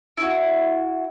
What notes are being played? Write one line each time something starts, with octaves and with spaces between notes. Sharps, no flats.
E4 F#4